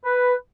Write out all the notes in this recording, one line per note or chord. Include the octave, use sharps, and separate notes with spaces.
B4